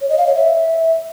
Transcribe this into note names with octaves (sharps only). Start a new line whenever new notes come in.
C#5
D#5
F5
C#5
E5